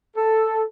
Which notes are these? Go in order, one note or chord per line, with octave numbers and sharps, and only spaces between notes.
A4